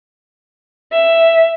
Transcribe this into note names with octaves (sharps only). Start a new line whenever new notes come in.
E5